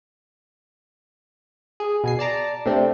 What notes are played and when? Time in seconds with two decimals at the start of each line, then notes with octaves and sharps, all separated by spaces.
1.80 G#4
2.04 B2 G#5 C7
2.19 D5 A5 A#5 D6
2.66 C3 A3 C4 D4